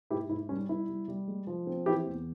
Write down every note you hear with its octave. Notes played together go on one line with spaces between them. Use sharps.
G#2 E4 G4
G#2 E4
G3 C#4
G3 E4
G3
G3
G#3
F3
C4
E3 E4 G4
E2